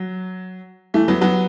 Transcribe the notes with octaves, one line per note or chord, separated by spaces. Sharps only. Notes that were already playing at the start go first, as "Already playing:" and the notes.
Already playing: F#3
E3 A3
F#3 B3
F#3 B3